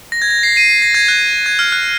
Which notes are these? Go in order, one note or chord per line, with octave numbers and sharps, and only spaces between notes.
A#6
G#6
A#6
C7
C7 D#7
C7
A#6
G#6
F#6
G#6
F6
F#6